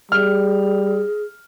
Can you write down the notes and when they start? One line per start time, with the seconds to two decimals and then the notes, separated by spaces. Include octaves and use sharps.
0.12 G3 G#4 F6